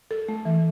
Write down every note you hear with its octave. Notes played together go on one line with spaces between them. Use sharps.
A4
A3
E3